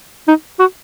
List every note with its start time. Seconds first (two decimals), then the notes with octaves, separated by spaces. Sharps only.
0.28 D#4
0.60 F#4